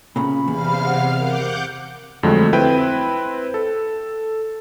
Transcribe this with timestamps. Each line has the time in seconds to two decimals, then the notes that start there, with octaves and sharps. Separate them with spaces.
0.16 A#2 C#3 B5
0.48 E2 C3 F5 F6
0.86 F#5
1.19 A#4 F#5 D6 G6
2.23 F2 D3 F#3 G#3 A3
2.53 C4 E4 B4 G5
3.54 A4